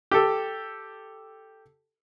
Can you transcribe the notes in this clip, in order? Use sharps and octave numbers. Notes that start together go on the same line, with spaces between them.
G4 A4